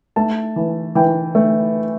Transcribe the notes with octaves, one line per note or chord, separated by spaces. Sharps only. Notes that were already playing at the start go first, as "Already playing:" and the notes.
A3 A5
E3
E3 G5
A3